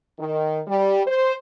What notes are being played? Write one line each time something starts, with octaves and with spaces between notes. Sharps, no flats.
D#3
G3
C5